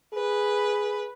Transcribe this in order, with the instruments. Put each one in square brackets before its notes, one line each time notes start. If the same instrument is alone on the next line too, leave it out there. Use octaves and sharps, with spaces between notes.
[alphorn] G#4 [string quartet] B4